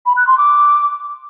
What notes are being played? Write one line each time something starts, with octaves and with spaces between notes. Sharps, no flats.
B5
F#6
C6
D6